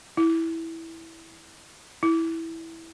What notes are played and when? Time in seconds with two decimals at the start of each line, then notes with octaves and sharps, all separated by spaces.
0.17 E4
2.03 E4